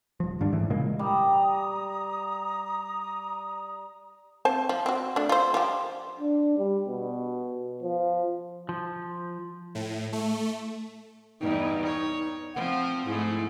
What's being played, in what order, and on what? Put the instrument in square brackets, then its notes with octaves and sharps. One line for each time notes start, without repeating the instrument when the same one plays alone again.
[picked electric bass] D#1 F3
G2 D#3 G3 D4
A1 G#2 E3
A#2 C#3 G#3 A#3
[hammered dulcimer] G3 [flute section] A#5 D#6
[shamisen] C4 C5 A5
F3
C4 F#4
A3 D4
F4 C5
F3 G4
[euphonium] D4
G3
B2
F3
[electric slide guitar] F3
[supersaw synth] A2
A3
[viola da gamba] E2 G2 [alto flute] D#4
[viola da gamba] C#5
[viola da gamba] F3 C4 [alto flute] F#5
[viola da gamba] G#2 A3 [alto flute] E4